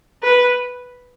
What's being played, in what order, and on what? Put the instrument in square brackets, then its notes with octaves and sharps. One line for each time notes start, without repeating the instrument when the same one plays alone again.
[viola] B4